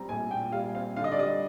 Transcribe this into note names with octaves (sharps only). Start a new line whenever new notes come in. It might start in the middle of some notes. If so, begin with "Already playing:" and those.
Already playing: G3 C4 A#5
A#1 G#5
A#2 G5
G3 F5
C4 F5
D3 F5
D#5
D5
G3 D#5